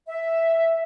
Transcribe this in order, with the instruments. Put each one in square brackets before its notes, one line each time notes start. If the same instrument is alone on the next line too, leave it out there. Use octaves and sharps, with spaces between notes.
[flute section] E5